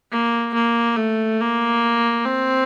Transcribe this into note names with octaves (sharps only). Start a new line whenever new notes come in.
A#3
A#3
A3
A#3
C4